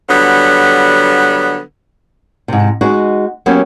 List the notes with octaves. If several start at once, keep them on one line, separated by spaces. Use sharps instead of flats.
D3 F#3 G3 B3
G#2 C3
G#3 D#4 F#4
F#3 A#3 B3 C#4 G4